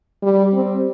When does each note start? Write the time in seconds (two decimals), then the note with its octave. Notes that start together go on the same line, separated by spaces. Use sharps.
0.23 G3
0.54 C4